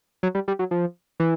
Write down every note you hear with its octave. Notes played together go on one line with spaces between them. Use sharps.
F#3
G3
G3
F#3
F3
E3